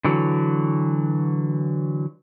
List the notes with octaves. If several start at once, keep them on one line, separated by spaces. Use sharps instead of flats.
D3 E3 F#3